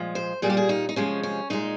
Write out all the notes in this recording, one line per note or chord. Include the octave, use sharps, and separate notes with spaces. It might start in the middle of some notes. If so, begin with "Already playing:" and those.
Already playing: A#2 F3 G#3
C5
A#2 G3 A#3 G#4
G4
G#4
D#4
D#4
C3 F3 G#3 C#4
C#4
A#2 G#3 D#4